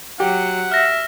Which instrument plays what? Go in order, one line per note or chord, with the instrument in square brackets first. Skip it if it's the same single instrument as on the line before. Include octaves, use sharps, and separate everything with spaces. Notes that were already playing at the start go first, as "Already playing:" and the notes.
[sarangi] F#3 [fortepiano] G4 [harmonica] F#5
[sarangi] E5 [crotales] F6 A#6